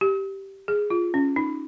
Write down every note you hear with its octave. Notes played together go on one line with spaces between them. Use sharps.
G4
G#4
F4
C#4
D#4